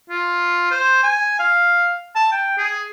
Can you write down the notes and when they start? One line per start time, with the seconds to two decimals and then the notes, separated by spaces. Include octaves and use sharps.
0.10 F4
0.71 C5
1.03 G#5
1.39 F5
2.15 A5
2.32 G5
2.58 G#4